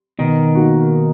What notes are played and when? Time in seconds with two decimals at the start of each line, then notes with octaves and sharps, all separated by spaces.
0.18 B2 D#3
0.55 A#3 D#4 F#4